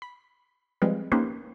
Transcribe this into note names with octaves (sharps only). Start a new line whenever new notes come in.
B5
F3 G3 G#3 C4 F4 B4
A#3 C#4 D#4 G4 B4 C5